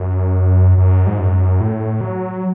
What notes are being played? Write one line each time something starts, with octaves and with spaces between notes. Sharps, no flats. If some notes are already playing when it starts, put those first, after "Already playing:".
Already playing: F#2
F#2
G#2
F#2
A2
F#3